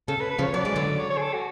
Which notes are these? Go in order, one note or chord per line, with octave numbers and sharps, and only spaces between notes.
C#3 A4
B4
B4
C#3 F3
C#5
F#3 D5
G#3
D3 F#3
C#5
C#5
G#4
A4
F#4